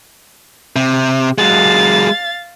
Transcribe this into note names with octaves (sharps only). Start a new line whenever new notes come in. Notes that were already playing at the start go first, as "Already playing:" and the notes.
C3
F#3 G#3 F5 A6